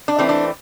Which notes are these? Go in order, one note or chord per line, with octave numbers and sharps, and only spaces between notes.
D4
E3 A3 C4
D4